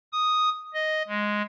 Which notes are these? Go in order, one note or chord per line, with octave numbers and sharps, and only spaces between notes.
D#6
D#5
G#3